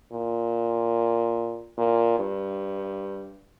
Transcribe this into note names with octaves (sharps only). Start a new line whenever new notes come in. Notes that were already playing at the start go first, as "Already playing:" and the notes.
A#2
A#2
G2